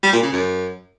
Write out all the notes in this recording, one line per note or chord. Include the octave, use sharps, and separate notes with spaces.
G3
A#2
C#3
F#2